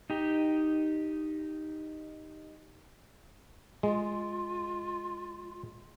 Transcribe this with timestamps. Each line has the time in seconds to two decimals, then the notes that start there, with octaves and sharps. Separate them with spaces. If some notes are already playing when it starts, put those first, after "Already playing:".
0.10 D#4 G4
3.83 G#3 F4